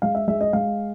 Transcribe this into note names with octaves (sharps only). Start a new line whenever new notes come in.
G#3 F5
E5
G#3 E5
D#5
G#3 F5